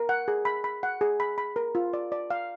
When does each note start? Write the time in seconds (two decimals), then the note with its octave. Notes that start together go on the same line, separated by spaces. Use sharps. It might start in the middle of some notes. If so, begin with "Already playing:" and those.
Already playing: A#4
0.09 F#5
0.28 G#4
0.45 B5
0.64 B5
0.83 F#5
1.01 G#4
1.20 B5
1.38 B5
1.56 A#4
1.75 F4
1.93 D5
2.12 D5
2.30 F5